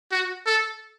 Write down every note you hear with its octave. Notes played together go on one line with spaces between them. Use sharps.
F#4
A4